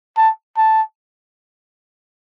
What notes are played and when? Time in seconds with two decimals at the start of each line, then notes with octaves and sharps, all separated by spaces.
0.17 A5
0.57 A5